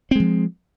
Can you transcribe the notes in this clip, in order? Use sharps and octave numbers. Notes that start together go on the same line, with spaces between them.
F3 G#3 C4